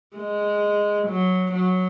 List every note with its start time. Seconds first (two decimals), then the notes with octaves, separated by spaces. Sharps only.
0.16 G#3
1.08 F#3
1.53 F#3